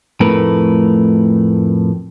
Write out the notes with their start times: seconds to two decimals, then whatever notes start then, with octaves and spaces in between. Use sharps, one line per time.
0.20 F2 A2 A3 A#4 B4